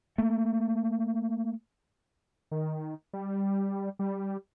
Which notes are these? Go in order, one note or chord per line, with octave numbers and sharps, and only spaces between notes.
A3 A#3
D#3
G3
G3